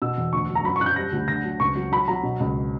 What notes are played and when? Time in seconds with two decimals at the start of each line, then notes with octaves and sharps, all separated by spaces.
0.02 B2 E6
0.18 E2
0.33 D2 C#6
0.49 F#3
0.55 A#5
0.64 F#2 B5
0.76 C#6
0.81 F#2 F#6
0.86 G6
0.96 G3 A#6
1.12 D2
1.28 D3 A#6
1.44 F#3
1.60 C#2 C#6
1.76 F#3
1.92 F#3 B5
2.08 F#3 A#5
2.23 B2
2.40 C#2